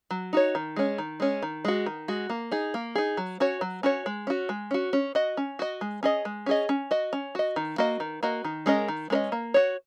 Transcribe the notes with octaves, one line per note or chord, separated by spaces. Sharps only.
F#3
D#4 F#4 C#5
D#3
G#3 C#4
D#3
G#3 C#4
D#3
G#3 F#4
D#3
G#3 F#4
A#3
D#4 G#4
A#3
D#4 G#4
F#3
C#4 F#4 C#5
F#3
C#4 F#4 C#5
G#3
C#4 F#4
G#3
C#4 F#4
C#4
F#4 D#5
C#4
F#4 D#5
G#3
C#4 G#4 D#5
G#3
C#4 G#4 D#5
C#4
F#4 D#5
C#4
F#4 D#5
D#3
A#3 F#4 D#5
D#3
A#3 F#4 D#5
D#3
G#3 C#4 A#4 D#5
D#3
G#3 C#4 A#4 D#5
A#3
F#4 C#5